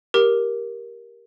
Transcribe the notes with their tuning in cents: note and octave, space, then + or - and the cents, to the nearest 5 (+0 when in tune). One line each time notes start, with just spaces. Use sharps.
G4 +0 A#4 +10